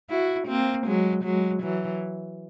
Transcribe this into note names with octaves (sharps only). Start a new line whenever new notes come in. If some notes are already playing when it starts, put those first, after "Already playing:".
E4 F#4
A#3 C4
F#3 G#3
F#3 G#3
E3 F#3